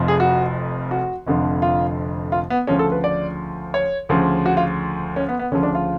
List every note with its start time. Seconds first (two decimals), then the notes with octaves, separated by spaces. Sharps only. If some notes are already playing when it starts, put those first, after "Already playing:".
Already playing: F1 F2 F3
0.08 G#4
0.20 F#4
0.91 F#4
1.27 F1 F2 D3 F3
1.62 F4
2.32 F4
2.50 B3
2.67 D2 C#3 F3 C#4
2.79 A4
2.92 B4
3.04 D5
3.74 C#5
4.09 D2 C#3 F3
4.46 F#4
4.57 F4
5.16 C#4
5.29 B3
5.39 B3
5.51 D2 C#3 F3 C#4
5.63 D4
5.75 F4